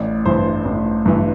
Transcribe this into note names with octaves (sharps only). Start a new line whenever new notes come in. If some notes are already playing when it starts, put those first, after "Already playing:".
Already playing: A1 D5
G2 E3 C5
A1
G2 E3